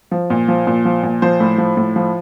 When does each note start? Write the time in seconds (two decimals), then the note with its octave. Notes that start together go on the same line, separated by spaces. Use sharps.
0.11 F3
0.30 A#2
0.48 F3
0.67 A#2
0.85 F3
1.03 A#2
1.22 F3 C5
1.40 A2
1.58 F3
1.77 A2
1.96 F3